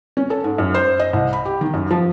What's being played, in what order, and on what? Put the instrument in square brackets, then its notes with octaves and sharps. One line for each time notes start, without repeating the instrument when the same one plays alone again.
[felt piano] C#4
A4
G#2
F#2
C5
D#5
C2
B5
G4
D#3
F#2
F3